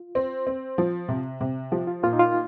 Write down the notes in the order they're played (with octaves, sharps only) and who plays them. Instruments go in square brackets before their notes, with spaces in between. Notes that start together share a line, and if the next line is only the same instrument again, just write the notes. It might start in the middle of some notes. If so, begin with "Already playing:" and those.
Already playing: [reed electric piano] F4
[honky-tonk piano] C4
C4
F3
C3
C3
[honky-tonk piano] F3 [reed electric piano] G4
[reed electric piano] F4
[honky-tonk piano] A#2 [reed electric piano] F4
[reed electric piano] D#4
F4